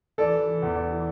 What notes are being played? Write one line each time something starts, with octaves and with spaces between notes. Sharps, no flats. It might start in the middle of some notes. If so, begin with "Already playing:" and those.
E3 A4 D5
E3
E3
E2
E2
E3